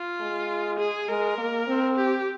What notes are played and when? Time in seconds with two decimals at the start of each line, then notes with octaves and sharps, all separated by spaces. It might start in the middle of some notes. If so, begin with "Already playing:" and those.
Already playing: F4
0.20 G#3
0.79 G#4
1.09 G#3 A#4
1.38 A#3
1.68 C4
1.96 G4